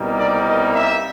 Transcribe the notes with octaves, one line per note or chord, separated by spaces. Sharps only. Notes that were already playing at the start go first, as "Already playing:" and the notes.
Already playing: C2 B2 G3 A#3 D#4
D5
D#5
E5